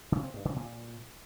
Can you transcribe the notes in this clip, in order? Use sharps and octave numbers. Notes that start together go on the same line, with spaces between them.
C#3
C4
G2
C#3
A#2